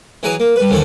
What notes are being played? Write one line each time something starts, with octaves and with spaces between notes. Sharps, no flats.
E3 F#3 E4 G#4 B4 A#5
A#3
G3 B4
D#2 D3 E3 C4 A4 F#5